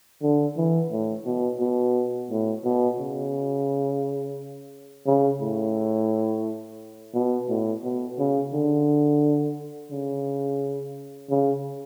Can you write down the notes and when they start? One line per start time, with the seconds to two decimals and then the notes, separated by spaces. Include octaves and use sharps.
0.22 D3
0.57 E3
0.91 A2
1.26 B2
1.60 B2
2.30 A2
2.64 B2
2.99 C#3
5.06 C#3
5.41 A2
7.14 B2
7.49 A2
7.84 B2
8.19 C#3
8.53 D3
9.91 C#3
11.30 C#3